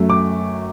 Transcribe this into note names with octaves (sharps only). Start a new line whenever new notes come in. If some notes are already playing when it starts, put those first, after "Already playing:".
Already playing: F#2 F#3 A3
D6